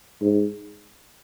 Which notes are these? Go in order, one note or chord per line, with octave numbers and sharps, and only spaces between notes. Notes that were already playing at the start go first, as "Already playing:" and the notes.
G#2